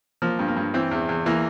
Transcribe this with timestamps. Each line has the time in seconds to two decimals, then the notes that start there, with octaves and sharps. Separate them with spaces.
0.22 F3 A#3
0.39 G2
0.48 A#3
0.57 G2
0.74 E3 C4
0.91 E2
1.09 E2
1.26 E3 A#3